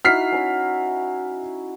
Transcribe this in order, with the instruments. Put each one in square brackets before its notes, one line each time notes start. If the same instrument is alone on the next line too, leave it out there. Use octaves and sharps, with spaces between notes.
[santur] D#4 E4 F#4 [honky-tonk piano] F6 B6 C7
[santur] C#4 A#5